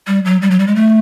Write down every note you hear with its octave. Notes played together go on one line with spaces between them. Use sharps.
G3
F#3
G3
F#3
G3
G#3
A3